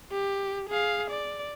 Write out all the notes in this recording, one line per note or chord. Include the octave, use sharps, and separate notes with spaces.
G4
G#4 F5
D5